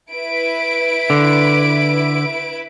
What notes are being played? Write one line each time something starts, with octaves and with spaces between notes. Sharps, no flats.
E4 B4 D7
D3